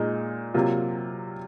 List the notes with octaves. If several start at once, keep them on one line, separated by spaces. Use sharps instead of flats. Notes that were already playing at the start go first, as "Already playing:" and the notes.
Already playing: A#2 G#3 D#4 G#4
C3 F#3 A#3 F4